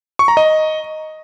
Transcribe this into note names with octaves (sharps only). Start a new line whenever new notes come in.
C#6
A#5
D#5